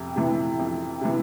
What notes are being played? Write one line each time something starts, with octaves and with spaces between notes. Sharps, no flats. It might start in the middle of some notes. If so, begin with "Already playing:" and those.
Already playing: F2 C3
C3 E3
F2
C3 E3